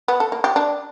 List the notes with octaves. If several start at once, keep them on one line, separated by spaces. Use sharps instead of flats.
B3
A4
A#3
G4
D4